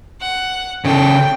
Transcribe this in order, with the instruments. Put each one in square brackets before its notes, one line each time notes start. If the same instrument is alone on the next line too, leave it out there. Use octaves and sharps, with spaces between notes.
[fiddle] F#5
[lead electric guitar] C#3 A4 [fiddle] G5